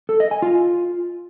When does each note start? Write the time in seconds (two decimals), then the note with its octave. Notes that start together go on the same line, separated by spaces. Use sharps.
0.09 A4
0.20 D#5
0.31 G#5
0.42 F4